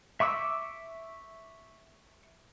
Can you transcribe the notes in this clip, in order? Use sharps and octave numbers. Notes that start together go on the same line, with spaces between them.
E5 C#6 D6 E6